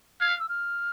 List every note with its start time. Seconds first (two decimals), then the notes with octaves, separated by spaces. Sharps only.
0.21 F5 G#6
0.29 F6
0.39 E6
0.49 F6